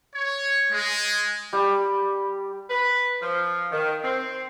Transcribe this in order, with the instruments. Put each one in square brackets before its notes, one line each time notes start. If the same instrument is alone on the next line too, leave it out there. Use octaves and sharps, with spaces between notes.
[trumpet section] C#5
G#3
[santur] G3 G4
[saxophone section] B4
F3
D#3
C4